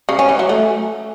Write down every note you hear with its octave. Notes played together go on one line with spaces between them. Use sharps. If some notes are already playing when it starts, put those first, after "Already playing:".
C#3
C#4
E3
F#3
A3